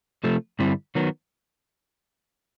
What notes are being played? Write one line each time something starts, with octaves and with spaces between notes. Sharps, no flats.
C3 F3 A3
G2 D3 G3 C4 E4
D#3 F#3 B3